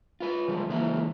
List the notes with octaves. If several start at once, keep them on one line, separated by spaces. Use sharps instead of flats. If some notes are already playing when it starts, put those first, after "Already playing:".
F4 B4
C#3 F3 G3 G#3
C#3 E3 F#3 G#3 A#3 E4